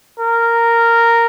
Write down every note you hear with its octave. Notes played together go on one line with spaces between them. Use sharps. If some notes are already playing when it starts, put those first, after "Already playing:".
A#4